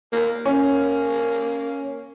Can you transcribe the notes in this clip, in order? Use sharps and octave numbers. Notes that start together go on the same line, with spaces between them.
A#3
A#3 C#4